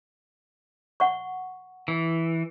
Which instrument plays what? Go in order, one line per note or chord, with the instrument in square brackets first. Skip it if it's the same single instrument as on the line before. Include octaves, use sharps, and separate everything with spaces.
[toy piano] F#5 C#6
[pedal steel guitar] E3